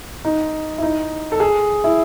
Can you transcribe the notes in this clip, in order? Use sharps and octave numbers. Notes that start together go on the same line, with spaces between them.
D#4
E4
D#4
A4
G#4
E4